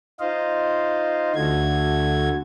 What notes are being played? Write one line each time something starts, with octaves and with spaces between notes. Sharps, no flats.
D#4 F4 C5 D#5 F5
D2 D3 A3 F#4 G#6